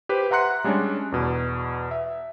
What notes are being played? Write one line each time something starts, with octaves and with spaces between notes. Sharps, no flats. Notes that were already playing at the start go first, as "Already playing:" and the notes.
G4 B4 C5
E5 F#5 A#5 C6 F#6 C#7
G3 G#3 C#4 D4
E2 B2
E5